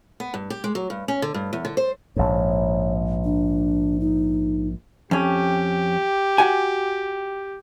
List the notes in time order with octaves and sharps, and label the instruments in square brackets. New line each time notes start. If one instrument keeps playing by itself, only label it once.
[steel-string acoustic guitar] B3
G2
G4
G#3
F#3
G2
C#4
D3
G2
E2
D3
C5
[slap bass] A#1 G#2 [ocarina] C#5
[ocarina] D4
D#4
[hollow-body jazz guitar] F2 C#4 [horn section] G4
[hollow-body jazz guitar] F#4 F#5 G#5